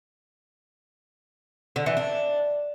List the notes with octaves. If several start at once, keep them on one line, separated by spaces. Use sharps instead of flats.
D3
E3
D4